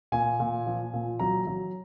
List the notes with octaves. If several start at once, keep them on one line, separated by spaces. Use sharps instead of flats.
A#2 G#5
A#2
F3
A#2
F#3 A#5
F#3